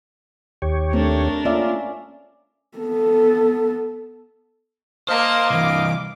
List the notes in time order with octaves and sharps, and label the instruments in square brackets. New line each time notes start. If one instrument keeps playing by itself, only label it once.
[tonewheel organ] D#2 G4 C#5
[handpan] A3 C4 [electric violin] D4 A#4
[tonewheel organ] A#3 F4 [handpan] C#4 D5 E5
[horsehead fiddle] B3 A4
[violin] A#3 A5 [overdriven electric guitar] C5 [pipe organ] D#5 F5
[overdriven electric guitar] C2 E3 [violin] D6